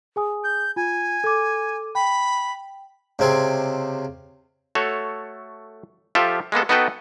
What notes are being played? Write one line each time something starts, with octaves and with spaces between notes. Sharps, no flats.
G#4 G#5 D#6
G6
F4 G#5
A4 D6
G5 B5
C#2 C3 C4 G#4
A3 F#4 A4 C#5
F3 F4 G4 A4 E5
G#3 A#3 B3 A4
B3 D#4 F#4 A4 B4 G5